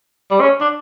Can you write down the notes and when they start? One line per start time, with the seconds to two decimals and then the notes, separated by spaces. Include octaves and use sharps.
0.31 G3
0.41 C#4
0.61 D4